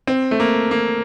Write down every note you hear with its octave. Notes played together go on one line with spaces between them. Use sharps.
C4
A3
A#3
A#3